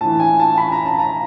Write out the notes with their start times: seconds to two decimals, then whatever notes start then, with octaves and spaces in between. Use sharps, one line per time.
0.01 A2 E3 A5
0.20 G#5
0.40 A5
0.58 B5
0.72 A#5
0.85 A5
0.99 A#5